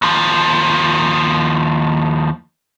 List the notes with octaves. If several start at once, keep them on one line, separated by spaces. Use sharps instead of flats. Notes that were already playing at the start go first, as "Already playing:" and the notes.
D#2 F3